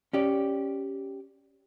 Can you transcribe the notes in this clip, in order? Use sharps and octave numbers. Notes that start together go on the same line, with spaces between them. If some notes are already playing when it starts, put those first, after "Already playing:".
C#4 G4 D5